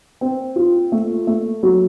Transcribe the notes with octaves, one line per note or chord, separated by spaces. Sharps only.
C4
F4
A3
A3
F#3